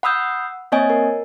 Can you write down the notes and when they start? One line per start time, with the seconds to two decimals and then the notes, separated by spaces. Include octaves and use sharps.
0.03 F#5 B5 D#6 E6 G6
0.72 A#3 C4 C#5 D#5 G#5
0.90 A#4